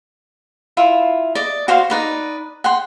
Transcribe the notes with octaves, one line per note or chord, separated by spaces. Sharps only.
E4 F4 E5
D5 D#5
F#4 C5 F5 C6
D#4 B4 D5
F#5 G5 C6